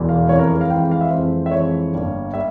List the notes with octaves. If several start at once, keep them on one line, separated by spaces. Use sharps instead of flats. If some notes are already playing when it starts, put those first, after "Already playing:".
Already playing: E1 E2 E3 G#3
F5
F2 E3 G#3 C#5
A#4
G#4
F5
F2 E3 G#3 G5
F5
E5
F2 E3 G#3 C5
E5
F2 E3 G#3 C#5
G1 G2 G3 A#3
G3 A#3 E5